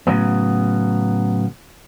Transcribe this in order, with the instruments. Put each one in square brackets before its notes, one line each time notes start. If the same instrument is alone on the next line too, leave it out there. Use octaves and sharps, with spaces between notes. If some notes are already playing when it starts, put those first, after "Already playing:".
[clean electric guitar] A2 C#3 F#3 B3